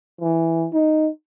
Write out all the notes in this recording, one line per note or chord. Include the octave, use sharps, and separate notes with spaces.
E3
D#4